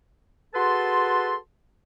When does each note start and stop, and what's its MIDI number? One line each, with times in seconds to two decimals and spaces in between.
0.54 1.35 66
0.54 1.35 68
0.54 1.35 69
0.54 1.35 71
0.54 1.35 81
0.54 1.35 84